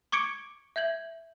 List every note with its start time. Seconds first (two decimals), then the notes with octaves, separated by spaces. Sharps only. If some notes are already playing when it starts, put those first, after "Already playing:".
0.12 C#6 D6 G#6 C#7 D7
0.76 E5 G6 G#6 F#7